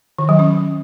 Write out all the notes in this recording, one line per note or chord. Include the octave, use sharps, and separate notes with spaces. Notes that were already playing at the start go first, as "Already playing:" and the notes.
D#3
F#3
C#4